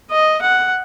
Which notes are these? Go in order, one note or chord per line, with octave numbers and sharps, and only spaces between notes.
D#5
F#5